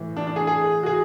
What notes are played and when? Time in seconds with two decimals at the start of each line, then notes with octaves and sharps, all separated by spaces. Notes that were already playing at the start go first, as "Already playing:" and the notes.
Already playing: A2 E3
0.17 D4
0.27 D4
0.36 G#4
0.47 G#4
0.83 F#4
0.86 G#4